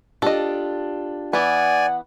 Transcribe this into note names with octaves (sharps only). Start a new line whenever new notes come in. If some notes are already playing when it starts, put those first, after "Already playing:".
D4 F4 G4 A4 D#5
E3 B3 D5 F#5 G#5